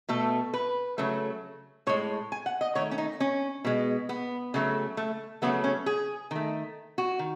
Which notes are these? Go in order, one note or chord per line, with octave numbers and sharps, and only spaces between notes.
B2 A3 A4
B4
C#3 F#3 A3
A2 G#3 C#5
G#5
F#5
D#5
D#3 A3 C#5
C#4
D#4
C#4
B2 G#3
B3
C#3 F#3 A3
A3
C#3 F#3 A3 B3
C#4
G#4
D#3 A3
F#4
D#3